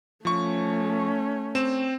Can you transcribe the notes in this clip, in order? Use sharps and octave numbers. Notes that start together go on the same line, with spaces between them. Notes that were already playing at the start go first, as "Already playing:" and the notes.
F3 A3 C#4 C#6
C4 E7